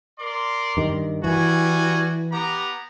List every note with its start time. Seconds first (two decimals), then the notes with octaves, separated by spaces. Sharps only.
0.19 A#4 D5 C6
0.77 G2 D#3
1.24 E3 G3 F#4 G#5
2.32 B3 G4 A#5